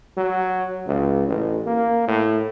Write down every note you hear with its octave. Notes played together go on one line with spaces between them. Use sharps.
F#3
C#2
A1
A#3
A2